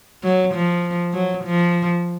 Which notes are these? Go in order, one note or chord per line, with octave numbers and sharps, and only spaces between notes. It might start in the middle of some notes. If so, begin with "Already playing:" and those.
F#3
F3
F#3
F3